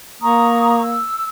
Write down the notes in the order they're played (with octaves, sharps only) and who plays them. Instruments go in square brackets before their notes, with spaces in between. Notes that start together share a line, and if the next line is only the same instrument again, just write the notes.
[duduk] A#3 [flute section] A#5 C#6 D#6
[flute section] E6